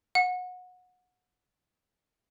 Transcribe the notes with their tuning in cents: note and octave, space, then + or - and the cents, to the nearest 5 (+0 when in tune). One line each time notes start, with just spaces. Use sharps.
F#5 -25